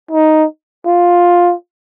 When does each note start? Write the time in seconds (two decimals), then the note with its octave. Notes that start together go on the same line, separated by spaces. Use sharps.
0.11 D#4
0.86 F4